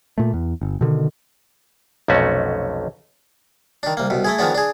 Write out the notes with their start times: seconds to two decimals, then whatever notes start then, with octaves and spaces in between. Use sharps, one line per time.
0.18 A#2 A3
0.34 E2
0.61 G1
0.81 B2 D3 D#3
2.08 B1 F2 C3 A3 C#4 F#4
3.83 D#3 D4
3.97 C2 A#3
4.10 C2 B2
4.25 A3 E4 G#4
4.39 D#3 F3 G#3 B3 D4
4.55 D4 G#4